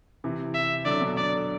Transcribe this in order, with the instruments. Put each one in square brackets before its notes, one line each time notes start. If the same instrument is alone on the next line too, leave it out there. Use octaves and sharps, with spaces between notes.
[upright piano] C3 E3
[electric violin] E5
[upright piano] D3 F#3 [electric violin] D5
[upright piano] B2 D3
[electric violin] D5